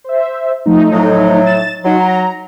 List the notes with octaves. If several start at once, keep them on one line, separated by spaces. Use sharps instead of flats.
C5 E5
F3 A3 D#4
A2 F#3
A6 E7
F#3 D#4 F#4 C6
A#5